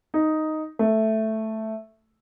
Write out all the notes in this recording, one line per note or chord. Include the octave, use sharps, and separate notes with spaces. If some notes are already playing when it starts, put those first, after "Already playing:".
D#4
A3